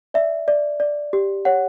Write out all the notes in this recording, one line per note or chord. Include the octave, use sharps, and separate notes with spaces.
D5 E5
D5
D5
G4
C#5 F#5